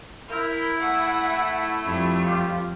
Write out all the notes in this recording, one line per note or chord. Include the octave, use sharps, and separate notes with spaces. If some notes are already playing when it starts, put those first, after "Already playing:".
E4 A#4 G6
A3 F#5
F2 G3
F4 G4